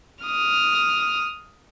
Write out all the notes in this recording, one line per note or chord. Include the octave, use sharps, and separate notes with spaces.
D#6 F6